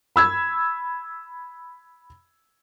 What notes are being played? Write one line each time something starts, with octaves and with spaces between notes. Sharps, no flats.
B5 E6 G#6